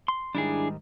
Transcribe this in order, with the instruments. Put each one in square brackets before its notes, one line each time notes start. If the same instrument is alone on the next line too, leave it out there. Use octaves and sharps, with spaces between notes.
[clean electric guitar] C6
[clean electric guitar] G#2 D#3 G3 [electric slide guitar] D4 E4 G#4